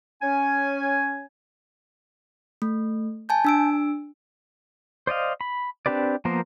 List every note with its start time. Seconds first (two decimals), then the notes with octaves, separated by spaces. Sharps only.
0.22 C#4 G#5
2.62 A3
3.29 G#5 A5 G6
3.45 D4 E6 D7
5.07 C5 D5 D#5 F5
5.41 B5
5.86 C4 D4 G4 B4 D5
6.25 F3 A#3 B3 A#4 C5